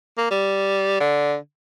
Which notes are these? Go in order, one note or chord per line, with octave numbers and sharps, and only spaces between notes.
A#3
G3
D3